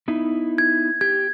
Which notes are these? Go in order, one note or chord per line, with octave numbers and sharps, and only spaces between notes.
B3 D#4 E4
G#6
G4 G#6